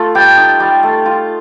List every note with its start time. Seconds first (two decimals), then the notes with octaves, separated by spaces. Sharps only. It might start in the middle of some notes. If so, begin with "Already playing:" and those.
Already playing: A3 F4
0.15 G3 G5
0.38 D#4
0.60 G3
0.83 A3
1.06 F4